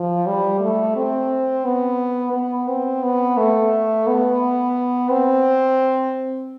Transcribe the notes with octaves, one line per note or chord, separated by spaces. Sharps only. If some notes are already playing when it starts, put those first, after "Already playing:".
Already playing: F3
G3
A3
C4
B3
B3
C4
B3
A3
B3
C4